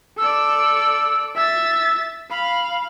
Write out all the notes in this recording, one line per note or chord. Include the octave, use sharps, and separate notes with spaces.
A4 D5 E6
E5 E6 A6
F5 B5